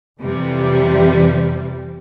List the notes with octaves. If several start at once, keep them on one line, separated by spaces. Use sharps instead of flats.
F2 C3 E3 G3